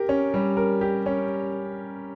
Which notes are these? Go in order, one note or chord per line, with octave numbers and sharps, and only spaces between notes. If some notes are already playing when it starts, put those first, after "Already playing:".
Already playing: G4 A#4
C#4
G3
A#4
G4
C#4